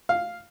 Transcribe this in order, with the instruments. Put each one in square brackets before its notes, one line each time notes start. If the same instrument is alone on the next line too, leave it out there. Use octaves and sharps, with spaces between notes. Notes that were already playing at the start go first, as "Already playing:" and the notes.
[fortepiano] F5